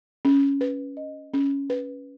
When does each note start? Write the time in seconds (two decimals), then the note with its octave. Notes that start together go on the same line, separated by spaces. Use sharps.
0.25 C#4
0.61 B4
0.97 D#5
1.34 C#4
1.70 B4